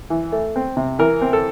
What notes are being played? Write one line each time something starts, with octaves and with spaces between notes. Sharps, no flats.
E3
A3
C4
C3
E3 A#4
C4
A4